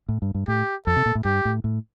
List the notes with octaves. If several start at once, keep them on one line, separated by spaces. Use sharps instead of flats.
A2
G2
G2
A2 G4
F2 A4
C3
A#2
A2
G2 G4
A2
A2